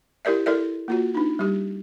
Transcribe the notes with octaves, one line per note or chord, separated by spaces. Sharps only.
E4 G4 A#4 D5 E5
E4 A4 A#4 D5 E5
A#3 F4 F#4
D4 D#4
G3 G4